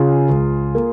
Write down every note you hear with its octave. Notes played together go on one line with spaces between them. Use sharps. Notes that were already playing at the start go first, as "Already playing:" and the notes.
Already playing: C#3 F4 G#4
C#2
A#3